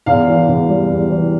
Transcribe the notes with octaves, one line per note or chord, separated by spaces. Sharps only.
E2 F5
E3
E2
G3
E2
E3